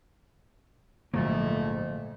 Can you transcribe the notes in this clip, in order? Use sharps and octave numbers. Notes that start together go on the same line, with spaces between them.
A#1 F2 G#2 D3 F3 F#3 A3 A#3